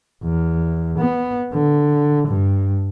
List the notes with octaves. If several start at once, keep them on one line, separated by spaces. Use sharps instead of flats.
E2
B3
D3
G2